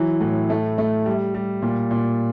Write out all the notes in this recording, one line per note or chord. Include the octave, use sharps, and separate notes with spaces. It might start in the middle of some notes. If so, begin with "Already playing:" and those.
Already playing: E3 F#3
A2
A3
A3
G3
G3
A#2
A#2